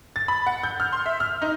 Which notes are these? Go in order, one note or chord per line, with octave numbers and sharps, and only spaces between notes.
A6
B5
F#5
G6
F6
C6
E5
F6
D#4